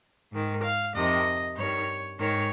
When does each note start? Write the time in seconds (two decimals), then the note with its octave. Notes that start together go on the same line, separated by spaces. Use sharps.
0.32 G#2 D#3
0.63 F5
0.94 F2 C3 D#3 D#5
1.56 G2 D#3 C#5
2.18 G#2 D#3 C#5